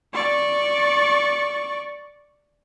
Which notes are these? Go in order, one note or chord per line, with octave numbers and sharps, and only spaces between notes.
D5 C#6